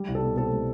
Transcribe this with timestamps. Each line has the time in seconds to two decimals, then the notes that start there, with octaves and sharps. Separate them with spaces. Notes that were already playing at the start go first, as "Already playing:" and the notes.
Already playing: G3
0.08 C2
0.15 A4
0.23 B2
0.37 C4 A4
0.52 G3